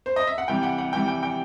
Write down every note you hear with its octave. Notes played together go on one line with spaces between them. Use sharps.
C5
D#5
E5
F#5
C3 E3 G3 G5
F#5
F#5
C3 E3 G3 G5
G5
G5